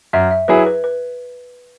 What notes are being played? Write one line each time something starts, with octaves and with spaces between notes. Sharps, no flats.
F#2 E5
E5
F#3 E4 G#4 B4
B4
B4